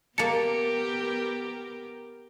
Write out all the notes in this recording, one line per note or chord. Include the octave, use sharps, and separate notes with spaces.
A#3 B3 G4 A#4 A5 C#7